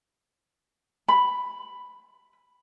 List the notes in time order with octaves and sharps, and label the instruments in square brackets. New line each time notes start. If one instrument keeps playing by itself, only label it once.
[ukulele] B5